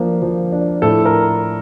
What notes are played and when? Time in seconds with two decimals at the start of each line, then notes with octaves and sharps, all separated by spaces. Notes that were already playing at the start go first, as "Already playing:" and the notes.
Already playing: F3 A#3 D4
0.22 F3
0.52 D4
0.82 A2 A4
1.05 A#4